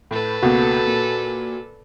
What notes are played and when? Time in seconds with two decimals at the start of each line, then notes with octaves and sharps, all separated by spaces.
0.11 A2 A4 B4
0.43 C#2 B2 A#3 F#4
0.87 A#2